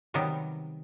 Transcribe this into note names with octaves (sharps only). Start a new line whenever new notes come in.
C3 D#3 F#3 G3 B3